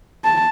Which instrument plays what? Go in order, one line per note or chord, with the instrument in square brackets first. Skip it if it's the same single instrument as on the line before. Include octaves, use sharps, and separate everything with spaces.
[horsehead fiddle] A5